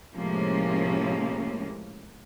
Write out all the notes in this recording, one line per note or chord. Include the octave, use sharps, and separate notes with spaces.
A2 C3 F3 G#3 A#3 C#4